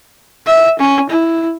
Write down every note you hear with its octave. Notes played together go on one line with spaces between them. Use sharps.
E5
C#4
E4